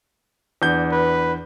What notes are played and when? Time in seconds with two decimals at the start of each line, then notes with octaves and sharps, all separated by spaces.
0.62 E2 D4 G6
0.92 B4